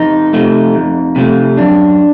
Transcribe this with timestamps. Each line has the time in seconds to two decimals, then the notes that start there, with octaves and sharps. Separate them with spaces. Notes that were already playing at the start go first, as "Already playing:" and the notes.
Already playing: F2 D#4
0.33 C3 F3 A3
0.75 F2
1.16 C3 F3 A3
1.57 F#2 D4